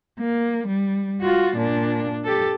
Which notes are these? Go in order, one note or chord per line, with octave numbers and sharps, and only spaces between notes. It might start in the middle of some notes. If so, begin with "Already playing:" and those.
A#3
G3
F4 F#4
A#2 D4
G4 A4